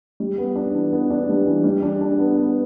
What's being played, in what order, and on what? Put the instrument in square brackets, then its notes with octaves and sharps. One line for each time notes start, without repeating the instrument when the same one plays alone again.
[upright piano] G3
B3
D4
E3
B3
D4
G3
E3
G3
D4
D4
B3
B3